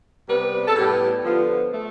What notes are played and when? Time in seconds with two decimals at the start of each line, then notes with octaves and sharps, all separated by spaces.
0.28 C3 G3 B3 B4
0.68 A4
0.76 A2 G3 B3 G4
1.23 D3 F3 B3 F4
1.72 A3